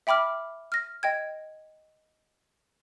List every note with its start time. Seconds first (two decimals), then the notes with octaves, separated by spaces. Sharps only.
0.07 E5 G5 B5 D6 F6
0.72 F6 A#6
1.03 D#5 G5 G#6